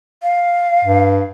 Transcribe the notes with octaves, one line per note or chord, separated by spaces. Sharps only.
F5
G2